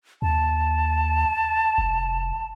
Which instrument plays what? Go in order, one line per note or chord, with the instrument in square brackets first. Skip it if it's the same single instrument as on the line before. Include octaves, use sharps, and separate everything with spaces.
[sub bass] D#2 [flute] A5
[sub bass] F1